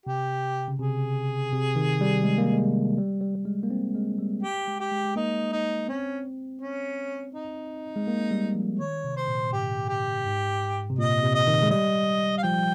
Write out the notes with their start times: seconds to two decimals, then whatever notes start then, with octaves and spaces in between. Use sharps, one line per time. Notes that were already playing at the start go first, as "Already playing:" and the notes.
0.06 C3 G4
0.68 C#3
0.79 C3 G#4
1.52 C3
1.76 D#3
2.01 G3
2.24 G#3
2.38 A#3
2.53 G#3
2.98 G3
3.21 G3
3.35 G3
3.45 G#3
3.63 A#3
3.70 C4
3.95 G#3
4.18 G3
4.43 G4
4.68 G#3
4.80 G4
4.92 G#3
5.05 G#3
5.16 A#3 D#4
5.52 D#4
5.88 C4 C#4
6.61 C#4
7.35 D#4
7.96 G#3
8.07 A#3
8.31 G3
8.55 F3
8.79 D#3 C#5
9.04 C3
9.16 C5
9.28 A#2
9.46 A#2
9.53 G#2 G4
9.88 G4
10.26 G#2
10.90 C3
10.98 A#2 D#5
11.23 C3
11.34 D#5
11.47 D#3
11.63 G#3
11.70 G3 D#5
12.38 F5
12.43 F3 G5